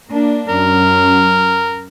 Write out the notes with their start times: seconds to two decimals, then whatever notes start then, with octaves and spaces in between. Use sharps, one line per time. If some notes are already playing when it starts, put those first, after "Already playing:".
0.10 A#3 D4
0.49 F#2 A#4